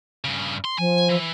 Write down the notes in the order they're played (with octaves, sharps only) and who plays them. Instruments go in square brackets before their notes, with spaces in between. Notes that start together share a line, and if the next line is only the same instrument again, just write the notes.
[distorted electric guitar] G2 C#3
C6
[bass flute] F3 [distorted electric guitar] G#5
[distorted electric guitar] E3